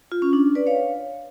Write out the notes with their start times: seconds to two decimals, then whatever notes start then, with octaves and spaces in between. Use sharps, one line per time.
0.12 F4
0.22 C#4
0.33 D4
0.55 B4 D5
0.67 C#5 F5